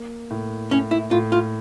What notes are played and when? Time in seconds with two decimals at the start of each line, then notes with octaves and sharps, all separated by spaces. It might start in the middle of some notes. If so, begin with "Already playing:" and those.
Already playing: A#3
0.30 A2
0.71 A2 C#4
0.91 E4
1.11 A2 F4
1.32 F4